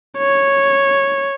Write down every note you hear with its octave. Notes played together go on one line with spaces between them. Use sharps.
C#5